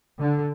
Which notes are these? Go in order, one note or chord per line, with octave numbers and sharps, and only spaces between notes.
D3